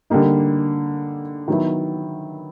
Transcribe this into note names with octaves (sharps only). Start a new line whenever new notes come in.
D3 G3 A#3 D#4
D#3 F#3 B3 E4